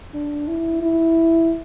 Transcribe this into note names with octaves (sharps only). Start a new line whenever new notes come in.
D4
E4
E4